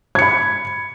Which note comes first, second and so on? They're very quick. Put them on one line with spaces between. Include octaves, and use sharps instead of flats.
G#6 C#7 B5